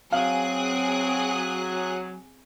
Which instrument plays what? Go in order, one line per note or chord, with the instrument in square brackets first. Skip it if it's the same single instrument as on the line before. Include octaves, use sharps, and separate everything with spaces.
[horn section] F#3 [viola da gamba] C4 [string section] G#4 D#6 F#6 [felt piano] F5